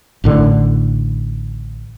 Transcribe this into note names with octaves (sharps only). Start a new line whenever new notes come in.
A1 A2 D3